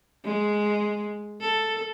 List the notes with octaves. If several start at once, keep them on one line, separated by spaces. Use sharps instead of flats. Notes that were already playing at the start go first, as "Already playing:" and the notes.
G#3
A4